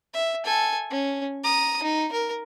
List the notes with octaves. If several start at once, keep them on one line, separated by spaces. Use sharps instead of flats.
E5
A4 G#5
C#4
A#5 D#6
D#4
A#4